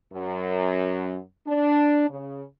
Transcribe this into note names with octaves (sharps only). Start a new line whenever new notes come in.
F#2
D4
C#3